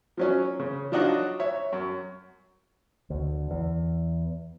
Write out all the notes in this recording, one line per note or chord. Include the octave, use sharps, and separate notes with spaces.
F3 F#3 C#4
C#3
F3 F#3 D4 D#4 F4 F#4
C#5 E5
F#2
D2
E2